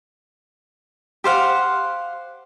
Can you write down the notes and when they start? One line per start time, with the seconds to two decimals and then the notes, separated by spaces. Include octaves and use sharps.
1.24 G4 C5 F5 F#5